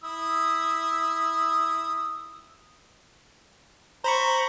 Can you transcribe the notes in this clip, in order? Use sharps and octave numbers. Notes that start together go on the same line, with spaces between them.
E4 D#6 E6
C5 A#5 B5 C#6